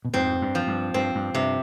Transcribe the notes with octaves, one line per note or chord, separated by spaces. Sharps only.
B2
F2 G#2 C4
G2
F3
G2
G2 C4
G2
G2 C3